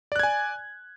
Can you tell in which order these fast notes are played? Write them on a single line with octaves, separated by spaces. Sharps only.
D5 F#6 G#6 G#5